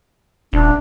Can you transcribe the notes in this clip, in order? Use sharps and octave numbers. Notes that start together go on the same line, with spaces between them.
D#1 D4